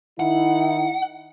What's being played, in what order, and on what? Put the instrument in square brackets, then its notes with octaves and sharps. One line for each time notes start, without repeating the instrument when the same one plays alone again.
[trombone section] D#3 D#4 E4 [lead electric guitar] F#5